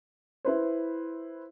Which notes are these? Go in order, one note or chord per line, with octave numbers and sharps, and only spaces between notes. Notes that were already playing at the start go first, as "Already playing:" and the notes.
E4 B4 C5